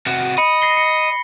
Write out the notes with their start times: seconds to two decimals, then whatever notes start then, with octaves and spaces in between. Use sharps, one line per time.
0.06 C3 F#4
0.38 D#5 B5 C#7
0.62 A#6 C7 G7
0.77 C#7